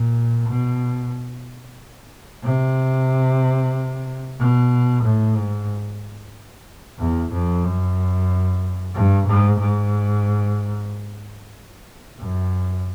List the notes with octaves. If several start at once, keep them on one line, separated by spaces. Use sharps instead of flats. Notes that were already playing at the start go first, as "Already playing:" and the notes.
Already playing: A#2
B2
C3
B2
A2
G#2
E2
F2
F#2
G2
G#2
G#2
F#2